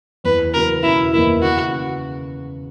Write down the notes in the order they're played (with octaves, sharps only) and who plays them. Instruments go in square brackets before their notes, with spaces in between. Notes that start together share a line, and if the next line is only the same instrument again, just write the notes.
[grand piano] E2 [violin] B4
[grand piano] C#3 F#3 [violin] A#4
[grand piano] E1 [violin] E4
[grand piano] E2 D#3 A#3 [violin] E4
[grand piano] C#3 [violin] F#4